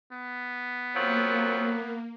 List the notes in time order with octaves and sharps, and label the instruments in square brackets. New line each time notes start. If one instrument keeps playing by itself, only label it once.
[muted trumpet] B3
[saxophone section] F2 F3 F#3 [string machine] A#3